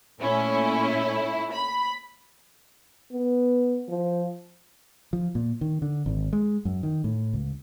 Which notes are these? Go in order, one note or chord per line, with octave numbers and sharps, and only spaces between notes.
A#2 A3 C#4 E4
B5
B3
F3
F3
A#2
D#3
D3
G#1
G#3
F#2
D#3
A2
C#2